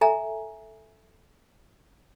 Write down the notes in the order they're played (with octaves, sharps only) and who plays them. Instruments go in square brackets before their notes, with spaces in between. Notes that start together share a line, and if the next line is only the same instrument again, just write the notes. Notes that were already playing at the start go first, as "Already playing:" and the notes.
[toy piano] A4 E5 G#5 A#5